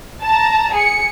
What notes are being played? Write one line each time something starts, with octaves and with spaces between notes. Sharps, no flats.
A5 A#5
G#4 C#7